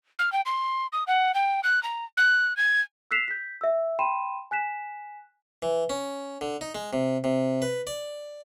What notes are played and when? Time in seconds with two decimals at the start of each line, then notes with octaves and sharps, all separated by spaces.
0.19 F6
0.32 G5
0.46 C6
0.93 D#6
1.07 F#5
1.34 G5
1.64 F#6
1.83 A#5
2.17 F#6
2.57 G#6
3.11 E6 F#6 B6 C7 E7 F7
3.28 G6 B6
3.61 E5 E6
3.99 G5 B5 C6 D#7 E7
4.51 G#5 F#6 B6 E7
5.62 E3
5.90 C#4
6.41 D3
6.61 D#4
6.75 G#3
6.93 C3
7.24 C3
7.62 B4
7.87 D5